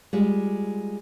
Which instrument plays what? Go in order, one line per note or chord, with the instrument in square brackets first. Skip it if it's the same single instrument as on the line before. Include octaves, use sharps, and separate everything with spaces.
[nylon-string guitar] G3 G#3 F4